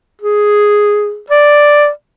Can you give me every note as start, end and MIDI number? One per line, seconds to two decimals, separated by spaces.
0.22 1.20 68
1.30 1.89 74